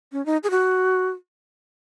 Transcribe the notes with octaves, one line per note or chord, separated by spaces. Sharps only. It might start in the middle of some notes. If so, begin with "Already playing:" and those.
C#4
D#4
G#4
F#4